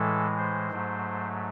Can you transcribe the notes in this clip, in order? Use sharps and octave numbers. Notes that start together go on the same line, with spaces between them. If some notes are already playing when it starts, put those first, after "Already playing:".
Already playing: A2 E3 G#3 A4
C5
G#2 F#3 A3